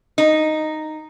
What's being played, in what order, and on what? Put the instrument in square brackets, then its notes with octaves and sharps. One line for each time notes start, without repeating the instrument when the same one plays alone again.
[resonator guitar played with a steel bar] D#4